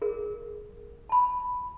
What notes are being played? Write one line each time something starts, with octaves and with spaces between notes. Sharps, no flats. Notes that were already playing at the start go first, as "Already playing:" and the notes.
G#4 A#4
A5 B5